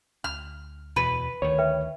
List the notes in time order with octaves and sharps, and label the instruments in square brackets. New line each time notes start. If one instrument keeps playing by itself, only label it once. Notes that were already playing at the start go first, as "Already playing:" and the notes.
[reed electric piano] D2 [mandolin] F6
[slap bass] E2 B2 [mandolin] B4
[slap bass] D2 D#3 [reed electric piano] C#5
[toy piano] B4 E5 G5